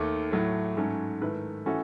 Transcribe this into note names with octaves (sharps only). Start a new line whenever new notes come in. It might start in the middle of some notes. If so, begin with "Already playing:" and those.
Already playing: D#2 D#3 A3
A2 F#3 A3
G#2 F#3 A3 C#4
G#2 D#3 A3 E4 B4
E3 A3 C#4 F#4 A4